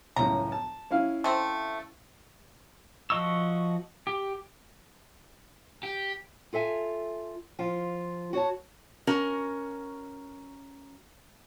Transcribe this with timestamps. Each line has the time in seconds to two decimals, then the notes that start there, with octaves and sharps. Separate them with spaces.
0.16 C#2 F#2 A2 A#5
0.52 A5
0.91 C#4 E4 F5
1.24 A3 C4
3.10 F3 F#4 D#5 C#6 E6
4.07 G4
5.83 G4
6.53 F4 A4 E5 G#5
7.59 F3 F4
8.33 F#4 C#5 A5
9.07 C#4 F#4 A#4